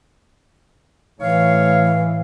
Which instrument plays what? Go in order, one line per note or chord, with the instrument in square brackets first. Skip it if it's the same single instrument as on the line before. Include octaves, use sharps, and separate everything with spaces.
[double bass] A2 E3 [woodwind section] C#5 F5